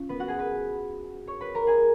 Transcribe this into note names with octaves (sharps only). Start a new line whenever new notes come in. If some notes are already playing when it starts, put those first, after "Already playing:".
Already playing: C#4 F4
B3 B4
F#4 F#5
G#4 G#5
B4 B5
C#5 C#6
B4 B5
A#4 A#5
G#4 G#5